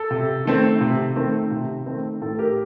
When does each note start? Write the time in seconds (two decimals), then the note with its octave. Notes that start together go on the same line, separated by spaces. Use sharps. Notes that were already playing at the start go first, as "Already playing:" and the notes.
Already playing: A4
0.11 C3
0.45 D#3 A3 C4
0.81 C3
1.16 D#3 A3 C4
1.51 C3
1.86 D#3 A3 C4
2.21 A2 A4
2.39 G4 A#4